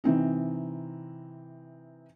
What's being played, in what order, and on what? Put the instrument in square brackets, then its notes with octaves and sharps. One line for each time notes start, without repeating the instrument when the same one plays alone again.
[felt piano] C3 E3 C4 D#4